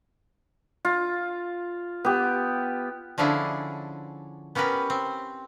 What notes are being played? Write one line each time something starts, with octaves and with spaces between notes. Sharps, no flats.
F4
B3 G4
D3 F3 C#4 D4 E4 G#4
B3 C#4 G4 A#4 B4
C4